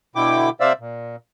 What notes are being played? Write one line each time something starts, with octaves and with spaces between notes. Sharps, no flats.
B2 D3 E4 G5 D6
C3 C5 D5 E5 F5 E6
A#2